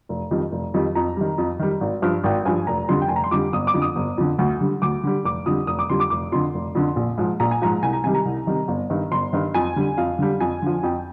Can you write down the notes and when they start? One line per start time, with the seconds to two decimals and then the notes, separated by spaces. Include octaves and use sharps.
0.09 F1
0.31 F2 D#3 G3
0.52 F1
0.74 F2 D#3 G3
0.95 F2 A#5
1.16 D#3 G3
1.38 F2
1.59 D#3 G3
1.81 G#1
2.02 G2 F3
2.24 G#1 G5
2.45 G2 F3 G#5
2.67 F1 A#5
2.88 F2 D3 G3 C6
3.02 G5
3.08 F1 G#5
3.16 A#5
3.24 C6
3.31 F2 D3 G3 D6
3.53 G1 D#6
3.67 D6
3.74 F2 D3
3.82 D#6
3.96 G1
4.18 F2 D3
4.39 D2
4.61 D3 G3
4.82 D2 D6
5.03 D3 G3
5.24 F1 D6
5.46 F2 D3 G3 D#6
5.67 F1 D#6
5.79 D6
5.90 F2 D3 G3 C6
6.00 D6
6.10 F1 D6
6.32 F2 D3 C6
6.54 F1
6.75 F2 D3
6.96 A#1
7.18 G#2 F3
7.40 A#1 A#5
7.51 G#5
7.62 G#2 F3 A#5
7.82 C2 G#5
7.93 A#5
8.04 C3 D#3 G3 G#5
8.15 A#5
8.25 C2
8.47 C3 D#3 G3
8.68 G1
8.90 G2 D#3
9.11 G1 C6
9.33 G2 D#3
9.54 F2 G#5
9.76 D3 G3
9.98 F2 F5
10.19 D3 G3
10.40 F2 G#5
10.62 D3 F3
10.83 F2 G5